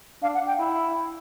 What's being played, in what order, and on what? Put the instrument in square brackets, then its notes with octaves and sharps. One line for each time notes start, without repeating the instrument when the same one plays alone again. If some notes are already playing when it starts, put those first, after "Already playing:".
[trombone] D4 [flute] F5
[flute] F#5
G5
[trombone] E4